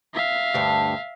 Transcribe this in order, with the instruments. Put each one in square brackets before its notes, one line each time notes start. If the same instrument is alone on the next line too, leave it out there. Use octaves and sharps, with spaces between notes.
[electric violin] E5 F5
[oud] D2 G2